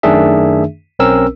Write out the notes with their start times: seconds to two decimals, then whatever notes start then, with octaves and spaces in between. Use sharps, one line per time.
0.03 F#2 D#3 A3 D4 G#4 E5
0.99 B1 C4 C#4 A#4 E6